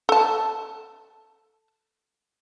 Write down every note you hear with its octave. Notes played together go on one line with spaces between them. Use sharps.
A4 A5